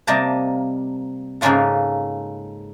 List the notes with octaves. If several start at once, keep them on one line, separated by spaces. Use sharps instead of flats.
C3 G3 A#3 D#5 A5 A#5
G#2 C#3 A#3 C#4 F4 A4